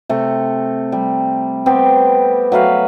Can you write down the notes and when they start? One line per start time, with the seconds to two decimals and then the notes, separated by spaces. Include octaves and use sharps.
0.09 C3 A3
0.92 G3
1.66 B3 C4 G4
2.52 F#3 A3 B4 F5